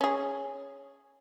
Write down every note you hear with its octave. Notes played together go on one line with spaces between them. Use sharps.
C#4 G#4